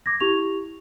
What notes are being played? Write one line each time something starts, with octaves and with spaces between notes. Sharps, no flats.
D6 G#6 A#6
E4 G4 C#6 F7